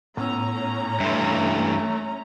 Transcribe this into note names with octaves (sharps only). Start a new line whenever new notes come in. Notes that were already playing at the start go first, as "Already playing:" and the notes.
A2 B3 C#4 A#5 E6
G2 E3 A3 E5 C6